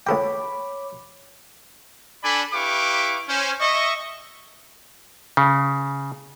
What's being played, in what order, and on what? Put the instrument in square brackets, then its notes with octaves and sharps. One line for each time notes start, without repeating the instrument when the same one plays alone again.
[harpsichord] C#2 A4 G5 [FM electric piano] C#5 B5 D6
[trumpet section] D4 A4 D5 G#5 B5
E4 G4 B4 F5 C#6 D6
C#4 C5
D#5 E5 C#6
[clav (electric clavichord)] C#3